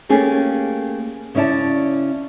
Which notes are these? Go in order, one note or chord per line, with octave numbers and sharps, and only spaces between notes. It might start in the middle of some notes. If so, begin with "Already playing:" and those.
A3 A#3 C#4 G4 G#4
C#3 C#4 E4 D5 A5